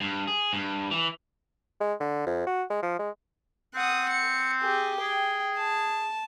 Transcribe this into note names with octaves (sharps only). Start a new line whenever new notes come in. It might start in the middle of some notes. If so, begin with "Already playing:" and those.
G2
G#4
G2
E3
G#3
D3
F2
F#4
G#3
F3
G#3
C4 F#5 D#6
C#7
G4 G#4
G#4 G5
A5